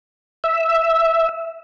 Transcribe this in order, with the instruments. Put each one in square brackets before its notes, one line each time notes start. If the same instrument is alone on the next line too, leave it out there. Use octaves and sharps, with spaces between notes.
[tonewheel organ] E5